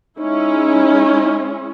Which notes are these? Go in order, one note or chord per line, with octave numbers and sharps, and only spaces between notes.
G#3 C#4 D#4 E4